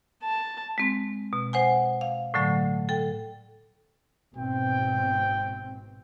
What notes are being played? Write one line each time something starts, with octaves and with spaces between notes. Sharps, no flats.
A5
G#3 C4
B2
C5 F#5 G#5
F5
A2 D3 F#3 A3
A4 G5
G#1 B2 C4 G5